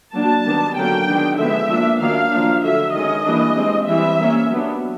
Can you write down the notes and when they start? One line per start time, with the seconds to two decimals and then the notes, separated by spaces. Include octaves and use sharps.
0.15 F#3 A#3 D4 A5
0.45 D#3 G3 B3 D4
0.76 D3 F#3 A#3 C#4 G5
1.08 D#3 G#3 B3 D4
1.38 D3 F3 G#3 B3 E5
1.70 F3 A#3 D4
2.01 D#3 F#3 A#3 D4 F5
2.32 F3 A#3 D4
2.63 D3 F#3 A3 E5
2.94 D#3 G#3 C#4 D#5
3.25 E3 G3 A#3 D4
3.56 E3 G#3 C4
3.88 E3 G3 C4 E5
4.19 G3 A#3 C#4
4.50 F#3 B3 D4